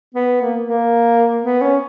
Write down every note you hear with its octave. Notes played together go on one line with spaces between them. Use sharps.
B3
A#3
A#3
B3
C#4